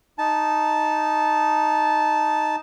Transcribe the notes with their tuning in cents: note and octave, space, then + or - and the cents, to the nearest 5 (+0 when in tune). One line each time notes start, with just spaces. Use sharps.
D#4 +0 A5 -10